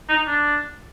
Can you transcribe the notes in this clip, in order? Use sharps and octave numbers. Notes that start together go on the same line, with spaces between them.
D#4
D4